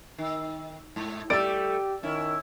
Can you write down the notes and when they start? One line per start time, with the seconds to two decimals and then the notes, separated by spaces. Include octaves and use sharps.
0.18 D#3
0.96 G#2
1.30 G3 A3 G4 D5 E6 A6 D7
2.03 D#3 C#4 E4